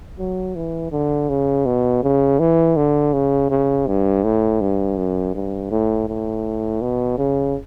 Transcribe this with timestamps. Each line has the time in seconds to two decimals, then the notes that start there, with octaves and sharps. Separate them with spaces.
0.19 F#3
0.56 E3
0.92 D3
1.29 C#3
1.66 B2
2.03 C#3
2.39 E3
2.76 D3
3.13 C#3
3.50 C#3
3.87 G2
4.23 A2
4.61 G2
4.97 F#2
5.35 G2
5.71 A2
6.08 A2
6.82 B2
7.18 C#3